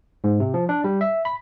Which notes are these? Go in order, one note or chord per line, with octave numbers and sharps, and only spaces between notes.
G#2
C3
F3
D4
G3
E5
B5